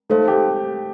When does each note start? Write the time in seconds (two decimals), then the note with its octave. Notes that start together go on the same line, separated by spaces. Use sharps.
0.10 A3 D#4 A4 C5 F5 A5
0.28 G4